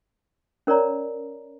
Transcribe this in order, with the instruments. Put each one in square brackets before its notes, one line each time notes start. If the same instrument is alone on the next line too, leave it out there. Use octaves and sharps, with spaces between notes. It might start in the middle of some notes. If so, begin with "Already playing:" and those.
[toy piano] C#4 A#4 C#5 D5 A#5